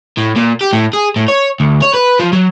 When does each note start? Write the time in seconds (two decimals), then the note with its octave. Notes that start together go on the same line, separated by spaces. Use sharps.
0.17 A2
0.36 A#2
0.61 G4
0.73 A2
0.93 G#4
1.16 A2
1.28 C#5
1.60 D2
1.82 C#5
1.94 B4
2.19 F3
2.33 F#3